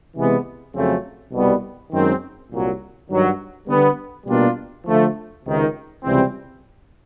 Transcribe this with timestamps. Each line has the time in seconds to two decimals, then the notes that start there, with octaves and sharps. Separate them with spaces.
0.16 C3 E3 G#3 B3
0.74 F2 C#3 F#3 A3 C4
1.32 C2 B2 G3 B3
1.92 F#2 D#3 G#3 C4
2.50 C2 A#2 F#3
3.09 G2 D#3 F#3
3.68 D3 G3 B3
4.26 B2 G3 A#3 D4 F4
4.86 D3 F3 A3
5.44 C#2 C3 D#3
6.02 C#2 C3 E3 G3 C4